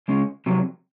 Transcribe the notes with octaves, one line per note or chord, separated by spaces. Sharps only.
C#3 G#3 C#4
F2 C3 F#3